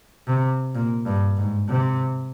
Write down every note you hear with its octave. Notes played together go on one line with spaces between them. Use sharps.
C3
A#2
G2
G#2
C3